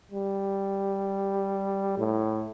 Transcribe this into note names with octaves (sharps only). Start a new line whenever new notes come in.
G3
A2